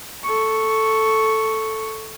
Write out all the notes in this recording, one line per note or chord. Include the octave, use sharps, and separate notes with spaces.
A4 C#6